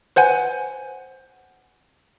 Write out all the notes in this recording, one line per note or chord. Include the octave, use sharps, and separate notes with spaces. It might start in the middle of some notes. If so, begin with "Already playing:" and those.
B4 C5 F#5 G#5